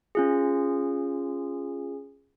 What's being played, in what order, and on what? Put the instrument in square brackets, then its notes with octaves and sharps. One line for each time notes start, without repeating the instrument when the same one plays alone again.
[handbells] C#4 F4 G#4